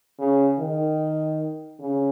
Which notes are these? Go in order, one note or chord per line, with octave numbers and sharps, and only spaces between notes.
C#3
D#3
C#3